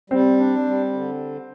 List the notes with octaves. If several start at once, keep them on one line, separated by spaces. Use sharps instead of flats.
G3 C4
D4
G3
D3